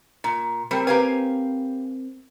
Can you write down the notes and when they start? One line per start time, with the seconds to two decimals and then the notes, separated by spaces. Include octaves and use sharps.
0.24 A#2
0.71 G3 A#3 C4
0.87 G4 B4 F5 G#5 A#5